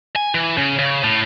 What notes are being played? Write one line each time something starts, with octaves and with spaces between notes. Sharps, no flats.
G#5
E3
C#3
C#3
A2